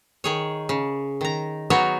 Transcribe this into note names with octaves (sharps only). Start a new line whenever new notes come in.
D#3 G#4 C#5
C#3
D#3 A#5
F#3 B3 D#4 F#4 G#4 C#5